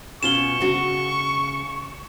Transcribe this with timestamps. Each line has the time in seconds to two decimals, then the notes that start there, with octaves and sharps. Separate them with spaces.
0.23 B2 C#4 F4 C#6 E7 G7
0.60 C#3 D4 F#4